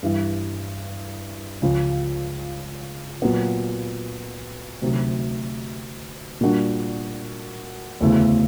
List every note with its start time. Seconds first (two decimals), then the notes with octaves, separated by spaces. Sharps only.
0.03 G2 E3 G3
1.62 C#2 C#3 F3
3.22 A#2 F#3 B3
4.82 D2 C3 D#3 F#3
6.41 A#2 G3 A#3 D4 F#4
8.01 E1 D2 C#3 E3 A3